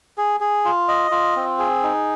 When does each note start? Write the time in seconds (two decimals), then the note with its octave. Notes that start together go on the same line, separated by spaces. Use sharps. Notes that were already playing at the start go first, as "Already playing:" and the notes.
0.18 G#4
0.40 G#4
0.65 F4
0.88 D#5
1.11 F4
1.36 C4
1.59 G#4
1.83 D#4